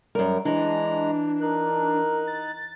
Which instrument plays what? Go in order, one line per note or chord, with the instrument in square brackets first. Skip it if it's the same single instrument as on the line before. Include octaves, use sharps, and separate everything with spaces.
[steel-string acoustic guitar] F#2 A#4 [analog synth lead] G3
[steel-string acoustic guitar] E3 [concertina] G#3 A#5 [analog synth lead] D4
[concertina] D#4 F#6 [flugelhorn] A#4
[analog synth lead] A6